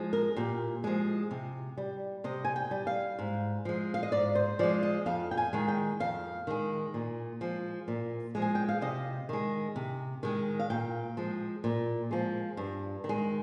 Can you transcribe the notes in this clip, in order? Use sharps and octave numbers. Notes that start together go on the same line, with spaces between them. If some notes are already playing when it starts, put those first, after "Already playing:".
Already playing: F3 G#3
A#4
A#2 G4
F3 G#3
C3
G3
C3 D#5
G#5
G5
G3
F5
G#2
F3 G#3
F5
D#5
G#2 D5
C5
F3 G#3 D5
D#5
F2 F5
G5
G#5
D#3 G#3
G5
F2 F5
D#3 G#3
A#2
F3 G#3
A#2
F3 G#3
G#5
G5
F5
C3 D#5
D#3 G#3
C3
D#3 G#3
F5
A#2 G5
F3 G#3
A#2
F3 G#3
G2
D#3
G#3